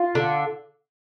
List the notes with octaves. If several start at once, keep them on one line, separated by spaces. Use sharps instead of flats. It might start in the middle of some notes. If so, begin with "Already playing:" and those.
Already playing: F4
D3